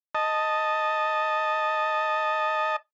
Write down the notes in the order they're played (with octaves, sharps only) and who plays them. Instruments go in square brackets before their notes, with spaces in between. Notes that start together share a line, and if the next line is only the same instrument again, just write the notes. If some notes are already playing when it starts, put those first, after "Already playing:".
[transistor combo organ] D#5 A5